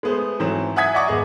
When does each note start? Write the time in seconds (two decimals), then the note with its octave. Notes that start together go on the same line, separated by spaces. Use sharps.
0.03 G#3 A3 B3 G#4 C5
0.39 G#2 E3 F#3 A3 C4
0.76 E5 F#5 G#5 D#6 G#6 B6
0.94 D5 D#5 F#5 A#5 C#6 D6
1.07 G#1 B3 G#4 D#5